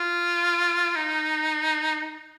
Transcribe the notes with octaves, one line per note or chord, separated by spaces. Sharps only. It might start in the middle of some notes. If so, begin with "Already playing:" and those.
Already playing: F4
D#4